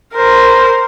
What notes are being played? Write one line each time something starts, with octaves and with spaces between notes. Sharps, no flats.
A#4 C5